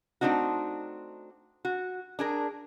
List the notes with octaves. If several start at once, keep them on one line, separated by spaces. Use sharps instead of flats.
A3 C4 D4 D#4 F#4
F#4
D4 G#4 A#4